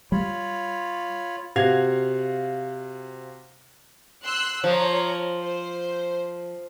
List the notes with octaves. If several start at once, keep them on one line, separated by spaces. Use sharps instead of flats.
G3 F4 C#5 B5
C3 F#4 F5 G#6 F7
C6 E6 F#6
F3 C#5 A#5
C5